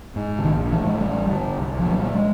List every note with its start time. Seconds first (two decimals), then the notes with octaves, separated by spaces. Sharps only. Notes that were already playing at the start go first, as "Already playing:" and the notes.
0.16 G#2
0.39 D3
0.44 A#1 D#3
0.72 A2 E3
0.87 G#3
1.00 A1 G3
1.29 G2 D3
1.58 C2
1.79 F3
1.86 A#2
1.91 F#3
2.02 G3
2.14 G#3